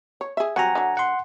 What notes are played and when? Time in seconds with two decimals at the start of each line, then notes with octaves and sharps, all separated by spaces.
0.21 C#5
0.37 G#4 E5
0.56 F#3 G3 C4 F#5 G#5 A#5
0.75 D3 F#3
0.97 F#5 C6